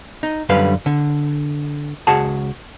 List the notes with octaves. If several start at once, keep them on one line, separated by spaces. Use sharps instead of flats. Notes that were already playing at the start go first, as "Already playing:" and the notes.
D#4
F#2 D3 G3 B4 F5
D3
C#2 F#4 G#4 F#5 A5